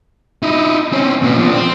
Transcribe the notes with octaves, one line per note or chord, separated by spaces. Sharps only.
D#4 E4
C4 C#4
A#2 B3
F3 D4
C4